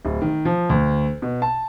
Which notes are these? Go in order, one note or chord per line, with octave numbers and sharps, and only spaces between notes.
D1
D#3
F3
D2
B2
A5